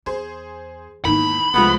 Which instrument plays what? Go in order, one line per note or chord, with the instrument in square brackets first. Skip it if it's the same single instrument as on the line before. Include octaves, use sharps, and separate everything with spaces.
[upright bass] E2 [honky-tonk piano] G#4 C5
[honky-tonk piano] E2 D#3 E3 [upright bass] G#2 A#3 [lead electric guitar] B5
[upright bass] C2 [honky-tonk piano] F3 G#3 A3 [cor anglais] B3